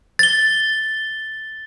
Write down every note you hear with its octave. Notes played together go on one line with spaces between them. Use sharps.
A6 G7